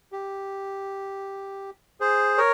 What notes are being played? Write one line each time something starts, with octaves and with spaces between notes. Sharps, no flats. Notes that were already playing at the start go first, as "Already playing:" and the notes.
G4
G#4 C5
A#4 C#5